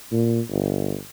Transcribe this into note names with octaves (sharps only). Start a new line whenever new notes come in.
A#2
G1